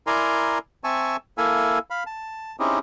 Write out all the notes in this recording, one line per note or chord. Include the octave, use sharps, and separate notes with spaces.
E4 A#4 D5 G#5 A#5 C6
C4 E5 G#5 A5 C#6
A#3 E4 A4 E5 F5 G#5
F5 B5
A5
C4 C#4 D#4 E4 G4 G#4